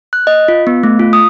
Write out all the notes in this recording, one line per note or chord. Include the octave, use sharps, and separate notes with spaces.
F#6
D#5
F4
B3
A3
F4
D#6